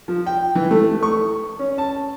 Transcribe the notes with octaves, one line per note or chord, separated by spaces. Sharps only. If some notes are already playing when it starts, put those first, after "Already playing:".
F3
G5
E3
A3
C#6
C#4
A5